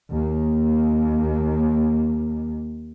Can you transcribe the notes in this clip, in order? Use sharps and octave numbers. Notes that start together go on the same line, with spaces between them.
D#2 A#3